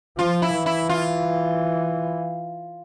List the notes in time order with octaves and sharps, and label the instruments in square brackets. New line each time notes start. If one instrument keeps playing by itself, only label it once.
[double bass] F3 [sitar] F4
[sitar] E4
[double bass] E3
[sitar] E4
F4